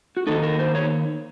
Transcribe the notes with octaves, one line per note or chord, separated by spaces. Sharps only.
F#4
D#3 A#3 D#4 A4
A#4
C5
C#5